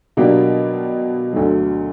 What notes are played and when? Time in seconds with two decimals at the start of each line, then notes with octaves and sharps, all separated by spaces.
0.17 B2 F#3 A#3 D4 G4
1.33 D2 D3 F#3